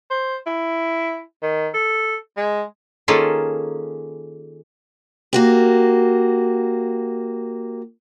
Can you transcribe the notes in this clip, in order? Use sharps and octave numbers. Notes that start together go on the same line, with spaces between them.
C5
E4
D#3
A4
G#3
D#3 A#3 C#4 F4 G#4 A4
A#3 F#4 G4